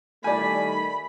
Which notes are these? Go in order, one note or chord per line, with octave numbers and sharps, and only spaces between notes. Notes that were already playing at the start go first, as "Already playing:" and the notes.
D#3 G3 A3 D5 G#5 B5